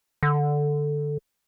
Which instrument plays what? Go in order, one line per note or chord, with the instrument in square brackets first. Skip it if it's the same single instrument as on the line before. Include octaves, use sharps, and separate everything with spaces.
[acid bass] D3